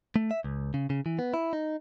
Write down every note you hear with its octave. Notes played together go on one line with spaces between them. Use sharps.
A3
E5
C#2
C#3
C#3
E3
B3
E4
D#4